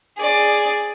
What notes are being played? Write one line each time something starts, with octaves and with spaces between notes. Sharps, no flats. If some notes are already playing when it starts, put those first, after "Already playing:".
G#4 D5